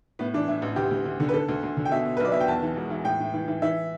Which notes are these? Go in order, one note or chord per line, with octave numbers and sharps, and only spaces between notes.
A2 B3
E3 D4
A2 E4
A1
D2 G4
D2
D2
D3
B4
D3 A4
D2
D2
D3
G5
B2 E5
B2
B4
B1 D5
B2 E5
G5
E2 A5
E3
E1
E3
A2 G5
A2
E3
E3
E3 E5